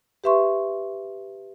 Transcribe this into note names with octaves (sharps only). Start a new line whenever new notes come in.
G4 B4 E5 C6 C#6